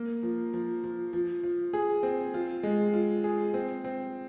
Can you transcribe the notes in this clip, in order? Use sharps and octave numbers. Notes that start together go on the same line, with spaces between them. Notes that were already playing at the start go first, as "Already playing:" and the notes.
Already playing: A#3
F3
F3
F3
F3
F3
G#4
C4
F4
G#3
F4
G#4
C4
C4